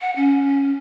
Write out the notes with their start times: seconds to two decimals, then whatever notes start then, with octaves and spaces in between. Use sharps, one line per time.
0.01 F#5
0.16 C#4